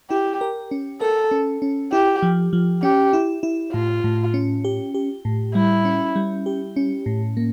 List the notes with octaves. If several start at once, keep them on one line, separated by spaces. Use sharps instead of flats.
E4 G4
A#4
C#4
A4 A#4
C#4
C#4
E4 G4
F3
F3
C#4 G4
E4
E4
A2 F4
A2
C#4
G4
G4
A2
G3 E4
C#4
G3
G4
C#4
A2
A#3